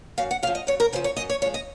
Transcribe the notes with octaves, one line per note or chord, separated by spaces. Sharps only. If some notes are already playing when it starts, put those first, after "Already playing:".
F#2 F5
F#5
C#3 F3 F5
D#5
F#2 C#5
A#4
C#3 F3 C5
C#5
F#2 D#5
C#5
F3 G#3 C#5
D#5